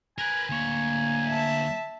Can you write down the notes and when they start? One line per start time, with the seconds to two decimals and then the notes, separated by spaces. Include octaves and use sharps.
0.18 A#4 B4 G#5
0.49 D2 A#3 C#5 G#5
1.27 E5 A5